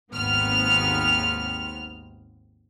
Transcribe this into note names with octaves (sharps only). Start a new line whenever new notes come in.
G#1 D#2 G#2 B3 C4 F6